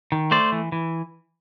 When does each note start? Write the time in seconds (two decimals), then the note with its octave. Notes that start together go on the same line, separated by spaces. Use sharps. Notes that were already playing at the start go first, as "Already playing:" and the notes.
0.12 D#3
0.31 A3 C5 D5
0.52 E3
0.72 E3